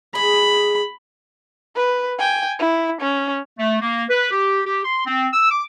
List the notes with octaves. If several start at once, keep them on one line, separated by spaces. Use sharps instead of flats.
G#3 G#4 B5
B4
G5 G#5
E4
C#4
A3
A#3
B4
G4
G4
C6
C4
E6
D6